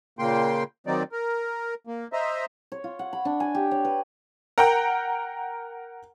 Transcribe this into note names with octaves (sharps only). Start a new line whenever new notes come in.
A#2 C#3 A#3 G5 C6
D#3 F#3 C4 D#4 D5
A#4
A#3
C5 D#5 E5 A#5
C#5
F4
F#5
B5
D4
G#5
G4
C#5
B4
A#4 F#5 G5 A#5